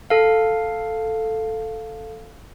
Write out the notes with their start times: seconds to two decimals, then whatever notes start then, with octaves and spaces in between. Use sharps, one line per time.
0.10 A4 F5